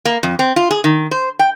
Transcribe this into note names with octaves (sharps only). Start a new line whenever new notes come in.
A#3
F2
C4
F4
G#4
D#3
C5
G5